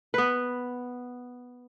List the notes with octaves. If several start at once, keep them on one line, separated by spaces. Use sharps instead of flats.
B3 B4